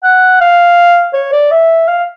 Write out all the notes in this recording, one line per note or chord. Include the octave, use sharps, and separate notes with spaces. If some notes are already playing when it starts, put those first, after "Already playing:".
F#5
F5
C#5
D5
E5
F5